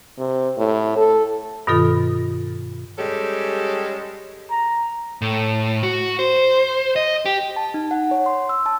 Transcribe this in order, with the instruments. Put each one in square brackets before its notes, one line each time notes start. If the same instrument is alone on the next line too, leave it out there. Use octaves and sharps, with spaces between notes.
[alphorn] C3
A2
A4
[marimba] G2 B2 D#3 F4 A4
[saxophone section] G3 G#3 C#4 G4 A4
[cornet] A#5
[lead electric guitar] A2
F#4
C5
D#5
G4
[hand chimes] A5
D#4
F#5
C#5
C6
E6
A5